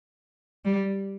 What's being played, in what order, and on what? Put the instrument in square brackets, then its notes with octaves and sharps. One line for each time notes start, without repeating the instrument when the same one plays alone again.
[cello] G3